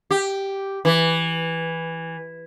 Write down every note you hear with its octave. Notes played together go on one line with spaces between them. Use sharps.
G4
E3